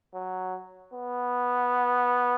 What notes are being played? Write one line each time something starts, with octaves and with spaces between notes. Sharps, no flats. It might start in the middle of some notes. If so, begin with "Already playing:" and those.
F#3
B3